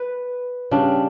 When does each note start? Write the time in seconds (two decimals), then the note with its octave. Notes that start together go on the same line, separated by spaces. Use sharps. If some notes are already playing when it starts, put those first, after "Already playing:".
Already playing: B4
0.71 C#3 G3 D4